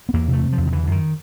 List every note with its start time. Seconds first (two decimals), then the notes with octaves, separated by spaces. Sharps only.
0.09 B3
0.13 E2 A#3
0.28 C3
0.33 A3
0.43 C3
0.52 F3
0.57 E2
0.67 D#3
0.73 D3 E3
0.83 D3
0.87 F#2 D#3